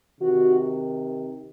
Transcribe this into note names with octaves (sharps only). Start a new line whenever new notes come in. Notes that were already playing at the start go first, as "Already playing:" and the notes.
C3 D#3 F#4